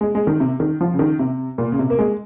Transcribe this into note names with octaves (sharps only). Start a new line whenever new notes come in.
G#3
G#3
D#3
C3
D#3
F3
C#3
D#3
C3
A#2
C#3
C3
A#3
G#3